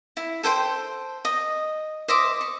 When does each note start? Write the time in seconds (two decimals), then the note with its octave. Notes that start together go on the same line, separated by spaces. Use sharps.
0.17 E4
0.43 A4 C5 G5 C6
1.25 D#5
2.08 C5 D#5 E5 D6
2.41 C#6